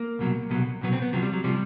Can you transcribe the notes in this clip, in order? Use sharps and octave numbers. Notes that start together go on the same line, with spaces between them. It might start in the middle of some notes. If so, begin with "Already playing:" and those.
Already playing: A#3
C2 B2 F#3
C2 B2 F#3
C2 B2 F#3 B3
C4
B3
C#2 C3 F3 F#3
G3
F#3
C3 F3 G3